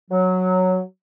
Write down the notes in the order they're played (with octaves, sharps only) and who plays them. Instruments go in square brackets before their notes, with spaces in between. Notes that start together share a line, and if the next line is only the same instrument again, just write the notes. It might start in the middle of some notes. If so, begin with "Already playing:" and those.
[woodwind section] F#3